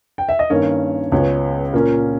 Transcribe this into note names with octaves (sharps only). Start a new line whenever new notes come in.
G5
E5
D#5
G2 D#3 A#3 C#4 C#5
C#2 C#3 G#3 B3 C#5
A#2 A#3 C#4 A#4